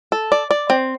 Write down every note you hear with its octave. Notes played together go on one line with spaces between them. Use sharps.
A4
D5
D5
C4